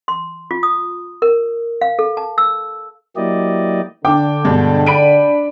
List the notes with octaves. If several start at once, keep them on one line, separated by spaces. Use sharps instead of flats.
C6
F4
D#6
A#4
F5
A4
A5
E6
F#3 A#3 E4 G4 D5 D#5
D3 D4 G5 D6
G2 B2 G#3
D4 B5 D7 D#7